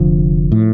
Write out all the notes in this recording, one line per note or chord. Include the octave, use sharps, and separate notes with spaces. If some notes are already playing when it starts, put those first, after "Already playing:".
Already playing: F1 F2 D3 F3
A2